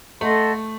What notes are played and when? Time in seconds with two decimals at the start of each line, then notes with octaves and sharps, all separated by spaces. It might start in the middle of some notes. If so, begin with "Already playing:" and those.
0.21 A3 A4 D#5 F#5 C6